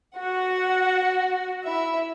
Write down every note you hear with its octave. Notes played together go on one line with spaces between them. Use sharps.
F#4 F#5
E4 E5